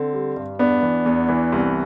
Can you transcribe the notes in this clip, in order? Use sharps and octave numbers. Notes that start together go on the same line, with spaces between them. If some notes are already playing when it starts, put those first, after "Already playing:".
Already playing: D3 C4
G3
G2
E2 B3 D4
E3
E2
E3
C2